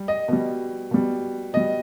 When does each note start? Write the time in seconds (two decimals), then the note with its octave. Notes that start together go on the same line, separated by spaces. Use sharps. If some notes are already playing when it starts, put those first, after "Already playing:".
Already playing: G3
0.08 D#5
0.28 B2 G3
0.91 B2 G3
1.54 B2 G3 D#5